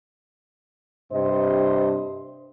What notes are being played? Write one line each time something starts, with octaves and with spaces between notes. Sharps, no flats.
G2 C3 C5 D#5